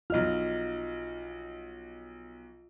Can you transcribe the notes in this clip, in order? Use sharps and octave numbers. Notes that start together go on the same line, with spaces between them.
B1 F4 D#5 F6